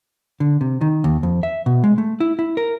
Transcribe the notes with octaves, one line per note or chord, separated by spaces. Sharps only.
D3
C3
D#3
D#2
F2
E5
B2
G#3
A3
E4
E4
A#4